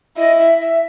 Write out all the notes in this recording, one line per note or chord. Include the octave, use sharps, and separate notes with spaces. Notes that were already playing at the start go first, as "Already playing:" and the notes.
E4 D#5
E5
E5